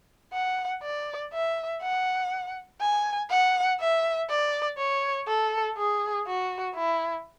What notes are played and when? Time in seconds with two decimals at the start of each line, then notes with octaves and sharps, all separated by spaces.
0.33 F#5
0.83 D5
1.33 E5
1.82 F#5
2.81 G#5
3.30 F#5
3.80 E5
4.29 D5
4.78 C#5
5.27 A4
5.78 G#4
6.27 F#4
6.75 E4